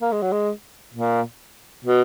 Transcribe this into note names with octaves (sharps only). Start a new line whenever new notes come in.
A#3
G#3
F#3
G#3
A#2
B2